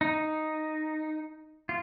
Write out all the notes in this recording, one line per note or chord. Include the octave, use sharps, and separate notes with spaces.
D#4
F4